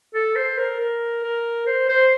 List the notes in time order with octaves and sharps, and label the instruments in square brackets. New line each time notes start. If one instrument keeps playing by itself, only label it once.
[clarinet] A4
C5
A#4
A#4
A#4
C5
C5